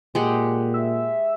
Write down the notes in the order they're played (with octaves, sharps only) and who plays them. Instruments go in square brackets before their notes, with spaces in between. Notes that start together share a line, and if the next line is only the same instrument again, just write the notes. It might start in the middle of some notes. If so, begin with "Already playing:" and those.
[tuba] A#2 [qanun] G#3 G4 F#5
[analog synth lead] E5